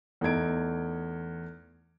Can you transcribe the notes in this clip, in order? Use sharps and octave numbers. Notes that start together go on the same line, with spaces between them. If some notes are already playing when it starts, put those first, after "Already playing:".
E2 A3 D#4 G#6 D7